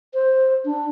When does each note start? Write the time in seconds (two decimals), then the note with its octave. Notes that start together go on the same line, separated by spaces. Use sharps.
0.14 C5
0.65 D4